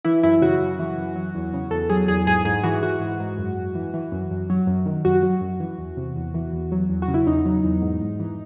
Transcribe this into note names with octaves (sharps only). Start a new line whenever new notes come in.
E3 E4
F#2 E4
C#3 F#4
F#2
E3
F#2
F#3
E2
C#3
E2 A4
F#3 G#4
E2 G#4
G#2 G#4
G#2 G#4
E3 F#4
E3 F#4
G#2
G#2
F#2
F#2
E3
E3
F#2
F#2
F#3
F#2
D#3
F#2 F#4
F#3
F#2
E3
E2
C3
E2
E3
E2
F#3
E2
F#4
C#3
E4
E2 D#4
F#3
E2
G#2
G#2
E3